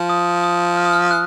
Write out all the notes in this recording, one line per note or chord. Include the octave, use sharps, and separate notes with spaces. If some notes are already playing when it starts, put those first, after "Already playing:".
Already playing: F3
D#6
D#6
F6
D#6
F6
F#6